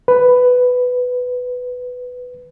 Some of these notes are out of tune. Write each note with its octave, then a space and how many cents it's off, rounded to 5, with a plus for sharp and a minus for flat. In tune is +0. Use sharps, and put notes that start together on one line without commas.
B4 +10